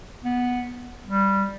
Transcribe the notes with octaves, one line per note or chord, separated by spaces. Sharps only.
B3
G3